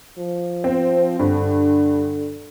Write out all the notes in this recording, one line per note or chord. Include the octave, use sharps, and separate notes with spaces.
F3
C4
G2 D3